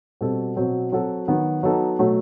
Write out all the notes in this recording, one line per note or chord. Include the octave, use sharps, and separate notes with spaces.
B2 G3 C4 F#4 A4
B2 F#3 C4
F#3 C4 F#4 A4
D#3 F#3 B3 F#4
F#3 B3 D#4 A4
B2 F#3 A3